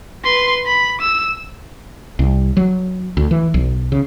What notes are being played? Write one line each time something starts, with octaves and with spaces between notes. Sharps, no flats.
B4 C6
B5
E6
C2
F#3
D2
E3
B1
C#3